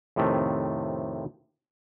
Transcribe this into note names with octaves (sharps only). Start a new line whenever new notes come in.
F2 A2 C3 D#3 A3